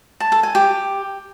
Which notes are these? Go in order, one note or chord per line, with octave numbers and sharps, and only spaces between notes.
A5
A4
G#5
G4